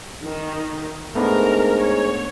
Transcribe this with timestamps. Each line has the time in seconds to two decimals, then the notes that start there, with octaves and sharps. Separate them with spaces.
0.25 D#3
1.15 G#2 A3 B3 D4 A#4
1.81 C#5